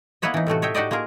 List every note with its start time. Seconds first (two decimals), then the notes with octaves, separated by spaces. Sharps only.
0.22 A#3 B3 E4 B4 C#5 D#5
0.34 E3 D#4
0.47 A2 C3 A3 F#4
0.62 C#5 D#5 E5 G5
0.74 D#4 F#4 G4 D5 D#5
0.91 A#3 F4 G#4 A#4